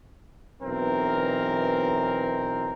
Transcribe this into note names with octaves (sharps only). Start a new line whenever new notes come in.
B1 E3 C4 A#4